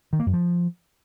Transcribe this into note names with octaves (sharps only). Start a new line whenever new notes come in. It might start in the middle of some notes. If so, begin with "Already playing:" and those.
D#3
A#3
F#2
F3